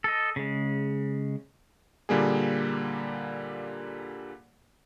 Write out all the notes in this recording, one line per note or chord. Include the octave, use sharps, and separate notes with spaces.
A4 D#5
C#3 G#3
A#2 D3 G3 A#3 G#4